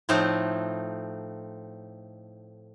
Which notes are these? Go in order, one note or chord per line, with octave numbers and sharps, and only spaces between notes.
A2 F3 A3 C4 D#4